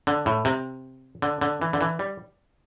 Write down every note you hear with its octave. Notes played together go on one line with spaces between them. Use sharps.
D3
A2
C3
D3
D3
E3
D3
E3
G3